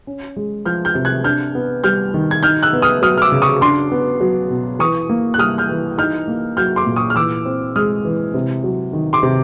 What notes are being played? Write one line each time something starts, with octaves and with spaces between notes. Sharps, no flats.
C#4
G#3
F3 F6 G6
F6 G6
C3
F#6 G#6
D4 F6 G6
B3
G3 F6 G6
D#3
G#6
D#4 F6 G6
E6 F#6
B3
D#6 F6
F#3 D#6 F6
F6
D6 E6
C#3
C#6 D#6
D4 C6 D6
B3
F#3
B2
E3 C#6 D#6
A#3
F#6
G3 D#6 F6
F6 G6
E3
D#4 F6 G6
A#3
F#3 F6 G6
C6 D6
A#2
C#6 D#6
F6
E3 D6 E6
C4
G#3 D#6 F6
E3
C3
F#3
D#3
C6 D6
C3